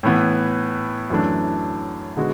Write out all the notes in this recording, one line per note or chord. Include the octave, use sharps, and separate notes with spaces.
A2 E3 B3
F#2 E3 A3 D4
D3 G#3 B3 F#4